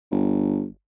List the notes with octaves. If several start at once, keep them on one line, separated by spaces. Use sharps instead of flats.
G1